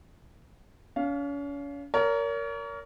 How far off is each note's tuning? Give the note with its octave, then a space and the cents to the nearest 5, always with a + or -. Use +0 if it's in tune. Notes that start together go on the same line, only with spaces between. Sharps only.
C#4 +40 F5 +0
A#4 -5 C#5 +40